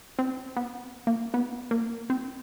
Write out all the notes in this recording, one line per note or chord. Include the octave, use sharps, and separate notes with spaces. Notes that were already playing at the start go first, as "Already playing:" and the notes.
C4
B3
A#3
B3
A#3
C4